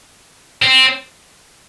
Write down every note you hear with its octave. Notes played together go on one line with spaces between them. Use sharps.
C4